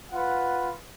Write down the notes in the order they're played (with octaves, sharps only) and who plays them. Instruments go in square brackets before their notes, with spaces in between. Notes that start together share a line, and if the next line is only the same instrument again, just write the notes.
[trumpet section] F4 B4 F#5